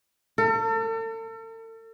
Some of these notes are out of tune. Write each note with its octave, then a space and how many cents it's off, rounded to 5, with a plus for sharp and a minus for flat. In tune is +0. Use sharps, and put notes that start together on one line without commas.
A4 +40